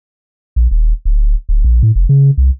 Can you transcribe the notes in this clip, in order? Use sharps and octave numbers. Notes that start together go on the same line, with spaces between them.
A#1
D#1
D1
D1
A#1
A2
F1
C#3
C2